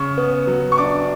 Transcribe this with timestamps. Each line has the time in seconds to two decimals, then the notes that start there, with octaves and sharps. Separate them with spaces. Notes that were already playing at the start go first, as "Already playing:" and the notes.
Already playing: C#3 C#6
0.17 B3
0.47 F#3
0.72 C#6
0.78 D4 D6